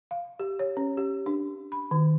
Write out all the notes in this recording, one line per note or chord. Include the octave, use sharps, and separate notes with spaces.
F5
G4
C#5
C#4
G4
D4
B5
D#3